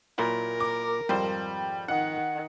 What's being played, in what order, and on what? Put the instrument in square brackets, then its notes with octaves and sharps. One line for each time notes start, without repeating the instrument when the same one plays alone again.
[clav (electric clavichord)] A#2 F#3 E4 [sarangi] A#4
[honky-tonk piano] D6
[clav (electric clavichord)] G#1 F2 C5 [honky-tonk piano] G3
[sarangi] D#3 [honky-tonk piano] F#5